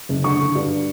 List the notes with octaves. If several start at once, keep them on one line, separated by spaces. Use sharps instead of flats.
F#1
D3 C#6
D3
G2